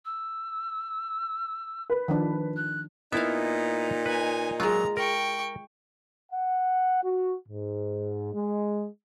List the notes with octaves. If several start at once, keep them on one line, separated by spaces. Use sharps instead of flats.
E6
B4
D#3 F3 D4
F#6
A#2 B3 D#4 E4 E5 F5
B4 G#5
F#3 G#3 F4 A#5
A#4 G5 C#6
F#5
F#4
G#2
G#3